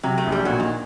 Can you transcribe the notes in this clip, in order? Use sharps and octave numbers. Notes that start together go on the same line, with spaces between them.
C3 F#3
A3
A#1
G3
A#2 F#3
D#3